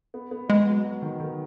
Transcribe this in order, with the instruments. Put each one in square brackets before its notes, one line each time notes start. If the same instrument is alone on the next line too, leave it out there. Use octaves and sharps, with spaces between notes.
[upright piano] B3
B3
[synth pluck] G#3 [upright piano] B3
[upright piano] F#3
F#3
D#3
D#3